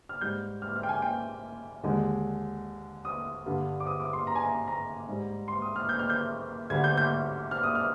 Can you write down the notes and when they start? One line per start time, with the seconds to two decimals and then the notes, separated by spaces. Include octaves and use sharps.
0.09 F6
0.21 G#2 G3 G6
0.62 F6
0.76 F6
0.83 G5
0.89 G#5
1.02 G5
1.83 D#2 D3 G#3
3.05 D#6
3.46 G2 D3 G3
3.80 D6
3.86 D#6
4.00 D6
4.13 C6
4.27 A#5
4.35 G#5
4.44 A#5
4.67 A#5
5.08 G#2 G3
5.48 C6
5.62 D#6
5.76 F6
5.89 G6
5.99 F6
6.10 G6
6.70 D2 D3 G3 G#6
6.84 G6
6.97 G6
7.51 F6
7.63 D#6
7.75 F6